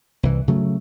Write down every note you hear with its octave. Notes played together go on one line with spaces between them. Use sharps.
C2 E3
C#3 F#3 A3